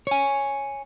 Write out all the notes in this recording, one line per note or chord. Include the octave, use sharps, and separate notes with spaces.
C#5 G#5